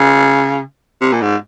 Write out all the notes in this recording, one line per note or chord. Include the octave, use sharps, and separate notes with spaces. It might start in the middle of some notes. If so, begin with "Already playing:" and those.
Already playing: C#3
C3
A#2
G#2